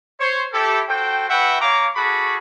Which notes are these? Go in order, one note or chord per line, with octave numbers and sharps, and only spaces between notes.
C5 C#5
E4 G4 A4
F#4 A4 C5 G5
E4 F#4 B4 E5 F#5 G5
A#3 C#5 F5 A#5 D6
F#4 G#4 A4 B5 C#6 D6